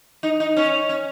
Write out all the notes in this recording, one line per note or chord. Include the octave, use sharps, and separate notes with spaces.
D#4
D#4
C#4
C#4